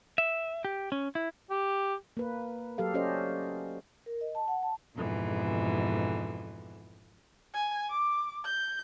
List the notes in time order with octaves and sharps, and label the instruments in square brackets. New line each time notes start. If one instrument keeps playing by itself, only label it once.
[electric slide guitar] E5
G4
C#4
E4
[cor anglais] G4
[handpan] A#3 B4
F#3 G4 A4 F5
C#4 G4 A4 C5 D5 D#5
[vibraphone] A#4
D#5
A5
F#5
A5
[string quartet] F2 G#2 B2 D3 E3
[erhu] G#5
D6
G6